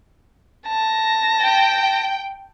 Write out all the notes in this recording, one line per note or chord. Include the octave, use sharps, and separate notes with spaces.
A5 A#6
G5